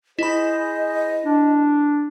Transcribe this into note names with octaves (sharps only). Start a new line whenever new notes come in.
E4 G#4 C5 D#5 B5
D4